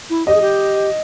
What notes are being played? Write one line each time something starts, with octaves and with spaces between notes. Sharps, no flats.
E4
G4 D#5
G#4
G4